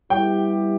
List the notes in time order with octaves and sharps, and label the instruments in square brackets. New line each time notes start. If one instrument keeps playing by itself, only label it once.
[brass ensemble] G3 B3 E4 G4 [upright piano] G5